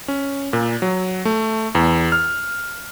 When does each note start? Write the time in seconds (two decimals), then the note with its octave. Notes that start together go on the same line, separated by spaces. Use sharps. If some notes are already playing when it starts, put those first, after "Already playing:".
0.08 C#4
0.53 A#2
0.82 F#3
1.25 A3
1.75 E2
2.12 F6